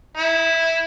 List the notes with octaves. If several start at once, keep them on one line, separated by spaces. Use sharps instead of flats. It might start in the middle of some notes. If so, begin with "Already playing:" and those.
E4